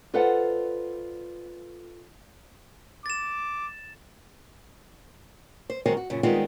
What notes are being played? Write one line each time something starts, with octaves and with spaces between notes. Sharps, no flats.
F4 A4 B4 C5 D5 F#5
D6 A6 E7
C5
D#3 F#3 G#3 C4 A#4 C5
F#4
F#2 A#2 C#3
D#3 G3 G#3 B3 C4 F4